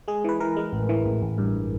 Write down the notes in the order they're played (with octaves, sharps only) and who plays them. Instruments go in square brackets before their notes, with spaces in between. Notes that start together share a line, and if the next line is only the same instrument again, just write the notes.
[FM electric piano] G#3 G#4
E3 B4
E3 A#4
G#3
A1
E3
A1
A1
G2